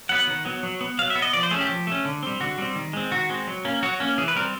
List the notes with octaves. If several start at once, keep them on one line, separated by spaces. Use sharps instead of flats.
F#3 B3 F#5
D#3
F#3 B3
F#3
B3
F#3 F5
E5
B3
D#5
F3 D5
C5
A3 C#4 G#4
G4
F3
A3 C#4
D3
G3 C4
D3 F#4
G3 C4
D#3
G#3 C4
D#3 F#4
G#3 C4
F#3
A#3 C#4
F#3 F#4
A#3 C#4
E3 G#4
B4
G3 C4 A#4